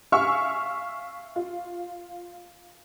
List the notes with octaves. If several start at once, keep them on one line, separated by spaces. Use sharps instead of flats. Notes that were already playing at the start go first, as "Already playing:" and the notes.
E5 F5 G#5 C#6 E6 F6
F4